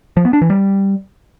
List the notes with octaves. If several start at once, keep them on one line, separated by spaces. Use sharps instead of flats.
F3
B3
D4
E3
G3